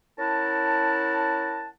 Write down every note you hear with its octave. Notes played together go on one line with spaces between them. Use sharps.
C#4 E4 A#4 F#5 A5